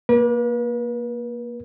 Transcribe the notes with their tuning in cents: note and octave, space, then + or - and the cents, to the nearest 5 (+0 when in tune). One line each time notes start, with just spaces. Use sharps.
A#3 +10 B4 -40